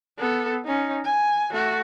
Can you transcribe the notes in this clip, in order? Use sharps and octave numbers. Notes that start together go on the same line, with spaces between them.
B3 A4
C#4 D#4
G#5
A3 F#4